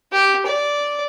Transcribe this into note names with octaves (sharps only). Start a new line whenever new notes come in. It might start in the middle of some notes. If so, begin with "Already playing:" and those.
G4
D5